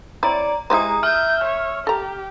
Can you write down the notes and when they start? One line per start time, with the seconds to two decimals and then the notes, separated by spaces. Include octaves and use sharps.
0.23 C4 E4 C#5 D5 A#5
0.70 G#3 E4 G4 C5 A#5 D#6
1.03 E5 F6 G6
1.44 C#5
1.87 G4 A4 A#5